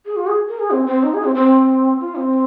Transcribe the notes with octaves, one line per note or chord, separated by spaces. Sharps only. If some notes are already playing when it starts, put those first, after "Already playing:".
G#4
F4
G#4
A#4
G#4
C4
C4
D#4
G#4
C4
C4
F4
C4